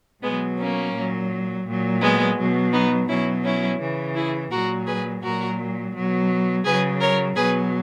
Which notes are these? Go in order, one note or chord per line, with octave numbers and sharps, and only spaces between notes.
B2 F#3 G#3 B3
A#3 C#4
A#2 F#3
A#2 F#3
G#3 B3
B2 F#3
B3 D#4
B2 F#3 C#4 E4
C#4 E4
C#3 E3
E4 G#4
A#2 F#3 F#4 A#4
G#4 B4
A#2 F#3 F#4 A#4
B2 F#3
C#3 F#3 G#4 B4
A#4 C#5
B2 F#3 G#4 B4